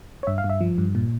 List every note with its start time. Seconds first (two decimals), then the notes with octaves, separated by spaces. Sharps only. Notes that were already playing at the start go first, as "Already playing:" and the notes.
0.23 C#5
0.27 G2 E5
0.38 F5
0.44 G2
0.50 E5
0.61 F3
0.78 G2
0.95 A#2